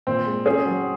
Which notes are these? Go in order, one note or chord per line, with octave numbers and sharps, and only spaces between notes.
A#2 C4
G#3
C#4 G#4
F#3